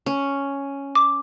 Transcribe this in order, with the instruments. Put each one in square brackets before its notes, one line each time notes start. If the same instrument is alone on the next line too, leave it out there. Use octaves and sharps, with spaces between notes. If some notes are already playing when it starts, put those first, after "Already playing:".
[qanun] C#4
[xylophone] D6